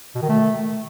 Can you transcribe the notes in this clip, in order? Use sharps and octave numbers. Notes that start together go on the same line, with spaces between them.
B2
D#3
A3